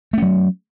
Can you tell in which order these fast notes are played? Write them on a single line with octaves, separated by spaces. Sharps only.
A3 C#4 F#3